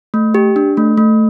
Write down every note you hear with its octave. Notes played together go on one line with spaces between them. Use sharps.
A3
G4
D4
A3
A3